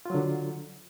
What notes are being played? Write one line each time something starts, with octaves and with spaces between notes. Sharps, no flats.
D3 F#3 F4